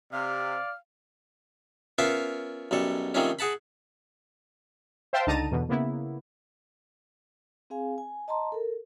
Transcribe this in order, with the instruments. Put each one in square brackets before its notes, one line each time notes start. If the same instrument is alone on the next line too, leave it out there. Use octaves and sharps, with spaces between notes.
[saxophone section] C3 [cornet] D5 [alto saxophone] F5 [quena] F6
[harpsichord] B3 C#4 F4 A#4 E5 F5
B1 F#2 G3 A4
D#3 F3 G3 A3 C4 C#4
G#4 F#5 A5 B5
[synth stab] C5 E5 F5 G5 A5 C6
C#2 D3 D#4 A5 A#5 D#7
E2 B2 D3
C#3 A#3 B3 E4
[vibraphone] C4 G#4 F5 G#5
G#5
D#5 A5 A#5 C6
A4 A#4